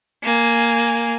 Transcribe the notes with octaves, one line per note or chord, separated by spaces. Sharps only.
A#3 G#5